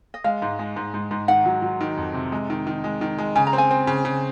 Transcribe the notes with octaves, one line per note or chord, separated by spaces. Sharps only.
D#5
G#3 F5
G#2
G#3
G#2
G#2
G#2
D#3 F#5
F#3
F#3
D#3
F2
C3
G#3
D#3
D#3
G#3
D#3
G#3
C#3 G#5
A#5
C4
G#5
C4
C#3
C#3